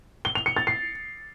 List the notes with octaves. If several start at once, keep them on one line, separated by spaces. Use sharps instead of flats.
G7
F7
C#7
A6
C7